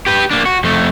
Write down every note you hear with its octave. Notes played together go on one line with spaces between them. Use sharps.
G4 B4
A#3 D4
F#4
F2 A3